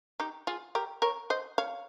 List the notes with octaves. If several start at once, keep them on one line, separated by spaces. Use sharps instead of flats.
D#4 G4
F4 G#4
G4 A#4
A#4 C#5
C5 D#5
C#5 F5